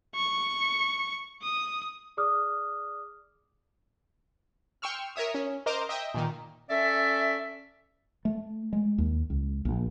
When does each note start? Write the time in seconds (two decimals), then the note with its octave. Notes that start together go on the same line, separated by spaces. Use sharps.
0.15 C#6
1.42 D#6
2.17 G#4 D5 D6 D#6 F6
4.82 G5 C6 C#6 E6 F6
5.16 A#4 C#5 E5 D#6
5.35 C#4
5.66 A#4 C5 D#5 A#5 C6 D6
5.89 D#5 E5 G5
6.14 A#2 D#3
6.70 C#4 A4 D5 E5
8.25 A3
8.73 G#3
8.98 D#2
9.30 C#2
9.65 A#1